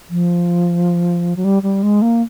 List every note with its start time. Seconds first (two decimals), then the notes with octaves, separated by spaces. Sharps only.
0.10 F3
1.36 F#3
1.44 G3
1.63 G3
1.83 G#3
2.02 A#3